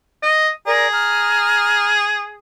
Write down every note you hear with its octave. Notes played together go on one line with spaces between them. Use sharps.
D#5
G#4 A#4 D5 A#5
A#5 F6